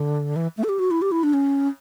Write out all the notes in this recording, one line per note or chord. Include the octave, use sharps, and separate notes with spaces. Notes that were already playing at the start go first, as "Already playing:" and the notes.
Already playing: D3
E3
A3
A4
G4
F#4
E4
G4
E4
D4
C#4